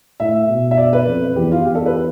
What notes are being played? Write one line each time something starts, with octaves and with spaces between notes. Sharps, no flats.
A2 E5
B2
E5
D5
B4
F2
E2 G4
F4
E2 G4
A4
B4